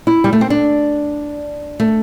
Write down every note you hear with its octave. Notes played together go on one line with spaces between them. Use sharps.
E4
G3
A3
C4
D4
A3